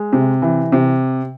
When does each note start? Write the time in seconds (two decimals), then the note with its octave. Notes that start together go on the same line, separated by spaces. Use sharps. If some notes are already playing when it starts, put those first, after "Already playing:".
Already playing: G#3
0.13 C3
0.42 E3
0.72 C3